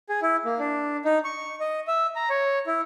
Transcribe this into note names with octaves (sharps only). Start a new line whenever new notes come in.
G#4
E4
A#3
D4
D#4
C#6
D#5
E5
A#5
C#5
E4